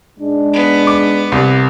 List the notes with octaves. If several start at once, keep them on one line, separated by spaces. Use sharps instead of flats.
G#2 G#3 D4
B3
D6
C2